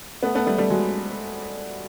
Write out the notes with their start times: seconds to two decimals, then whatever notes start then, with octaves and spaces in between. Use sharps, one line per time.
0.23 A3 B3
0.35 A3 B3
0.47 G3 A3
0.58 G3 A3
0.70 F#3 G#3